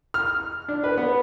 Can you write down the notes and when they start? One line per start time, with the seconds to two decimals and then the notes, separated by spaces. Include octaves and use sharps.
0.14 F6
0.69 D4
0.84 B4
0.97 B3